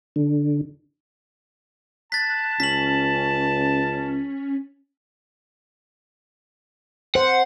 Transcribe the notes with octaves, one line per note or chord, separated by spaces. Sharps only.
D3
A5 F#6 A6 B6
C#2 C#4 B6 F#7
C5 F#5